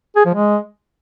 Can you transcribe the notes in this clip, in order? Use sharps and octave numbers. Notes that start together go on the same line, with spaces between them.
G#4
F3
G#3